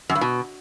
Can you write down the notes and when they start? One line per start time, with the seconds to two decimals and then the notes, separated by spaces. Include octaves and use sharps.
0.09 F#2
0.15 G2
0.21 B2